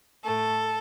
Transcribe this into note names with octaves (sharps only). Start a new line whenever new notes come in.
A2 A3 A4